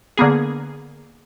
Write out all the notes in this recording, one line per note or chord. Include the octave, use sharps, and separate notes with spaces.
D3 A#3 B3 G#4